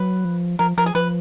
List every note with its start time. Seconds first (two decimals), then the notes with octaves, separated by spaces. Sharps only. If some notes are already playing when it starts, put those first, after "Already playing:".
Already playing: F#3 B4
0.25 F3
0.59 F3 A#4
0.77 F3 A#4
0.86 G#4
0.95 F3 B4